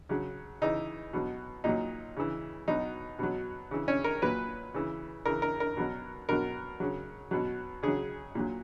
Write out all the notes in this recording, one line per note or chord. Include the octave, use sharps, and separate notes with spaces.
C#3 F#3
C#3 E3 D#4
B2 F#3
A#2 F#3 D#4
C#3 E3
B2 F#3 D#4
B2 F#3
C#3 E3
C#4
A#4
A#2 F#3 B4
C#3 E3
C#3 E3 A#4
A#4
A#4
B2 F#3
B2 F#3 A#4
C#3 F#3
B2 F#3
C#3 F#3 G#4
A#2 F#3